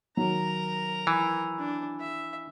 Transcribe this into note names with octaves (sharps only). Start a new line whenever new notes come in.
D#3 F#3 A#4 A#5
E3
D4
E5